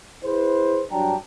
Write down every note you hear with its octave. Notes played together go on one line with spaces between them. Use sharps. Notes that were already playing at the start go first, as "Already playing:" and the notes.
E4 G#4 B4 C5
G2 F#3 D4 G5 A5 A#5